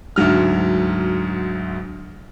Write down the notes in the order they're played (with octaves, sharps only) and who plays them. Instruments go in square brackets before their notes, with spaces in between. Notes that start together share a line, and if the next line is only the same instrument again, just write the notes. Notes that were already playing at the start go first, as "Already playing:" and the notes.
[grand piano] D2 G#2 F#3 F6